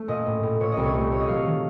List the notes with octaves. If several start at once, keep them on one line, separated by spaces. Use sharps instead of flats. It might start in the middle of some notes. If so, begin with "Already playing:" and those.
Already playing: A3
A#2 D#5
A2
A2
A#2 C#5
D#5
C2
C#5
A3 C#5
A3 C#5
D#5
F#3 F5
D#3